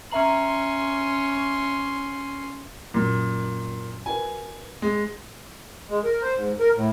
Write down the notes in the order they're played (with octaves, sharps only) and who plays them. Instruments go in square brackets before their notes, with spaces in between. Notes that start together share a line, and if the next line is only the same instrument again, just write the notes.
[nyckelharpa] C#4 C6 [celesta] E5 A#5 F#7
[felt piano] F#2 F#3 [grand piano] A#2
[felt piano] F#4 A#4 B4 [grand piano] G#5
[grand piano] G#3
[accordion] G#3
A#4
C5
G#2
A#4
A2